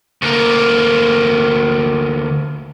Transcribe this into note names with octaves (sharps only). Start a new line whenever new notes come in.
D2 A#3